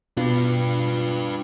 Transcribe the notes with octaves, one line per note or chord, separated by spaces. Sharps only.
B2 D4 F4 B4